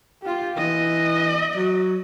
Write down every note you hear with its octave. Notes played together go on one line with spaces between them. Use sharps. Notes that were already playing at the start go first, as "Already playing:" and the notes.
F4 G4
E3 D#5
F#3